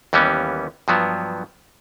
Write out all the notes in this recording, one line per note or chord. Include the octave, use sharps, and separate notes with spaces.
D#2 E3 G3 B3 C#4
G2 F3 F#3 B3